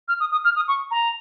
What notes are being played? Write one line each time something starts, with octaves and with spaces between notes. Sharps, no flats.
F6
D#6
D#6
F6
D#6
C#6
A#5